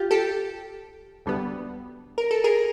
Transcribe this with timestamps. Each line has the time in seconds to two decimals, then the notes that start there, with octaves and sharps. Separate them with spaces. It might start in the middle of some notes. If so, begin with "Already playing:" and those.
Already playing: F4 G4
0.11 G4 A4
1.26 D2 D3 G3 B3
2.18 A#4
2.31 A4
2.44 G#4 A#4